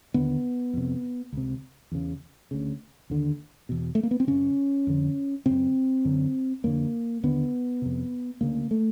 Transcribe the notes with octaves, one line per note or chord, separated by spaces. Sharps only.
D#2 D3 B3
F2 C3
C#2 C3
E2 C#3
D2 C#3
D#2 D3
E2 B2
A3
A#3
B3
C4
F#2 C#3 C#4
F2 D3
F#2 C#3 C4
F#2 D3
F2 D3 A#3
D#2 D3 B3
F2 C3
D2 C#3 A#3
A3